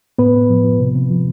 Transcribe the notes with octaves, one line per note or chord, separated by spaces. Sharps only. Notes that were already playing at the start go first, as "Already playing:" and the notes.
A2 B3 B4
A2
F3
F3
C3
C3
F3